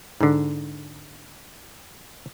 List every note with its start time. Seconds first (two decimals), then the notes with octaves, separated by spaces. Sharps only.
0.21 G#2 D3